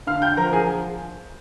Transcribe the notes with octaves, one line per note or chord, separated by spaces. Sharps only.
D3 F5 F6
G5 G6
F3 A#4 A#5
G#4 G#5